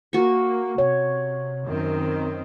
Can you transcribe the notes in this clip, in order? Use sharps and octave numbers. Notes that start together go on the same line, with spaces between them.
A#3 F#4 C#6
C3 C#5
F#2 D#3 C4